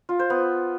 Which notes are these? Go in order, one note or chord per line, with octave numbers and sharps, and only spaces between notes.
F4
C5
B3